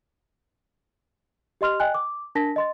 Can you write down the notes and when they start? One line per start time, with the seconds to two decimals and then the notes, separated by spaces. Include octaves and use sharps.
1.61 G4 D#5 C6 F6 F7
1.80 D#5 G5 G#5 F#6
1.94 D6
2.35 D4 A#4 A5 A#6 B6
2.56 D#5 C6 A6